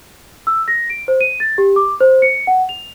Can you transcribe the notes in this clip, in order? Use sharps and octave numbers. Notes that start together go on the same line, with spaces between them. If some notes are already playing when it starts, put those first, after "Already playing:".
E6
A#6
D7
C5
D#7
A6
G4
D6
C5
C#7
F#5
F7